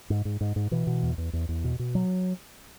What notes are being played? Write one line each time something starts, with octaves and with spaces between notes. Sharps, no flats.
G#2
G#2
G#2
G#2
B2 E3
B2
E2
E2
E2
E2
B2
B2
F#3